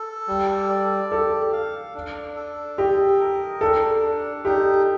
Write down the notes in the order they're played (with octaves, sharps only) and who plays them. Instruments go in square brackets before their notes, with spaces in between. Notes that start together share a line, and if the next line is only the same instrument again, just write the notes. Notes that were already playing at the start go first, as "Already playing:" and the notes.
Already playing: [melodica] A4
G3
D5
[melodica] G4 [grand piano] A4
[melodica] F5
D4
A4
[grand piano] G4 [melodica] D#5
[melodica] A#4
[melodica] D4 [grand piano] A4
[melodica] D4
[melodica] D#4 [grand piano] G4